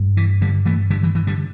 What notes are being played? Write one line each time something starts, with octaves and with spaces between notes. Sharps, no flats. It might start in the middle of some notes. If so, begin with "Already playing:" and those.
Already playing: G2
E3
D3 G3
E3 A3
D3 G3
E3
E3
D3 G3